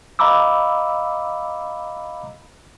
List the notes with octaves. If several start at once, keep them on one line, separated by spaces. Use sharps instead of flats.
D#5 F5 A#5 B5 D6 E6